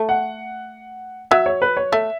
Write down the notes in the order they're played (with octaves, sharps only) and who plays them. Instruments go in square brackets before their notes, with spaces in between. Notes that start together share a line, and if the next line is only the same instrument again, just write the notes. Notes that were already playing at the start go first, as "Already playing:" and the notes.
Already playing: [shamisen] A3
[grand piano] F#5
[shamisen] F#3 [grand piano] E5
[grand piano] C#5
B4
C#5
[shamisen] A3 [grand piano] E5